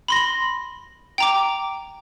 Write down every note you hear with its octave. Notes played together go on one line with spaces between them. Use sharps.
B5 C6 A#6
G5 A#5 D6